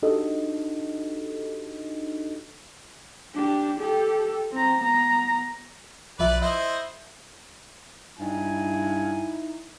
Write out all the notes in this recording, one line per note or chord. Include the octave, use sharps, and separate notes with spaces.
D4 D#4 F#4 G4 A4 D#5
D4 G4
G4 A4
C4 A#5
B3 A#5
B1 F3 B4 D5 E5
E4 C5 D#5 E5
G2 D#4 E4 G#5